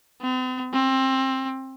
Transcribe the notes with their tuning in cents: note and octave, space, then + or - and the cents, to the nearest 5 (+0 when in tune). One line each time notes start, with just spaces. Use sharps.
C4 -45
C4 +20